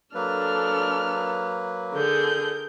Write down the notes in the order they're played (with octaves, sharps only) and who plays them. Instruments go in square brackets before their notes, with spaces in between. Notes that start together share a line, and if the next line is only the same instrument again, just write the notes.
[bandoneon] F#3 A#3 B4 [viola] D4 A4 [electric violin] F6
[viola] D3 G#4 [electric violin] A#4 G6